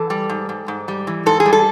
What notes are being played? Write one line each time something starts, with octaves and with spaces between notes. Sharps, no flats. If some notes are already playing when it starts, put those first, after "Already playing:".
Already playing: E3 A4
G3
G#2
G#2
G#2
G3
E3
G#2 A4
G#4
G3
A4